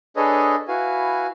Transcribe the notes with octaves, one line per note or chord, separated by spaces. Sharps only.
D4 G#4 A4 B4 C#5 D#5
E4 F#4 B4 F5 G#5